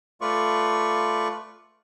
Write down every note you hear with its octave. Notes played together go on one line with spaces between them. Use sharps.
A3 F4 B4 D5 C#6